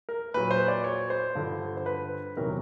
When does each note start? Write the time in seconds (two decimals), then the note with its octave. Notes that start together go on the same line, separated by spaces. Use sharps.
0.09 A#4
0.34 A#2 F#3 B4
0.51 C5
0.68 D5
0.84 C#5
1.10 C5
1.35 G2 D3 F3
1.77 C5
1.86 B4
2.37 E2 C3 D#3 F#3 A#4